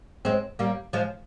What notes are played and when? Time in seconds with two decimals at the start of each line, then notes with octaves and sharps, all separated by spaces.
0.25 G#3 C4
0.59 G3 A#3
0.93 F3 G#3